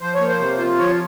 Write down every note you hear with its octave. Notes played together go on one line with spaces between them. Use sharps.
F3 C5
C#5
A#3
C5
C3
F4
F3 C#5